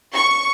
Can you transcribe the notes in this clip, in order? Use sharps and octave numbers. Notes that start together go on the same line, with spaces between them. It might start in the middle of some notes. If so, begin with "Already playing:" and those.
C#6